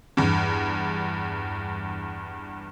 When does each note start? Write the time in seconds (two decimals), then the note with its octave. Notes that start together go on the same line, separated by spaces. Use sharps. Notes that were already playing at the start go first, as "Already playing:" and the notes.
0.17 E2 G2